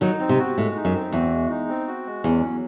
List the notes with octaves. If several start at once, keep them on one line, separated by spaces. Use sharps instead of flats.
D#3 F#3 D#4
C4
C3
F#4
A2 G#3
D#4
F#2
C4
E2 F#4
G#3
D#4
C4
F#4
G#3
E2 C#4
F#3